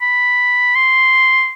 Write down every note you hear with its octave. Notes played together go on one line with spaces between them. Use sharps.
B5
C6